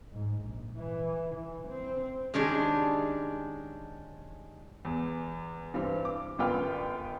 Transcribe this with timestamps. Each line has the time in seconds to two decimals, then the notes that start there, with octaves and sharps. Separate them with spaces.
0.12 G#2
0.43 A#1
0.76 E3
1.35 E3
1.68 C4
2.34 D#3 G#3 C#4 D4 G4 G#4
4.85 E2
5.74 G2 E3 C4
6.05 D6
6.38 G1 F#2 F4 B4 G5 F6